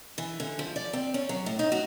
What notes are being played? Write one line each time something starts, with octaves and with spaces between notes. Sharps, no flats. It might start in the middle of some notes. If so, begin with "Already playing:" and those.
E3
D3
F3
D5
C4
C#4
F#3
A2
D#4
F#4